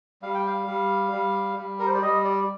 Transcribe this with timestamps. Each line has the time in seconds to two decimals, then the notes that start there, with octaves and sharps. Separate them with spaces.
0.22 G3 F5
0.35 G5
0.47 F5
0.67 G3
1.12 G3
1.57 G3
1.79 A#4
1.87 C5
1.94 D5
2.02 G3 D#5
2.25 D5